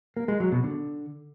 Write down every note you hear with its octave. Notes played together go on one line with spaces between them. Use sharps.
A#3
G#3
F#3
B2
D3